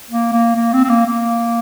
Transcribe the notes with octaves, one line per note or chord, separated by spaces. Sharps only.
A#3
A#3
A#3
C4
C4
A#3
A#3